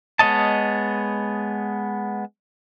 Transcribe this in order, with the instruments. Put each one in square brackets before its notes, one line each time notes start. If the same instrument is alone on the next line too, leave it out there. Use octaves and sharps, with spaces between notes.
[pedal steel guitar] G#3 B3 C#5 D#5 A5